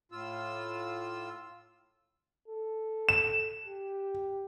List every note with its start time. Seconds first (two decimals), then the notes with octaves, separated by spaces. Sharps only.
0.12 A2 F4 E6
2.48 A4
3.09 E7
3.65 G4